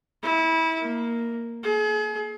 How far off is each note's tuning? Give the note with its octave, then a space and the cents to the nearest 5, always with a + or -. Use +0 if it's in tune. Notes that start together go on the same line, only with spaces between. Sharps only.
E4 -25
A#3 +0
G#4 +40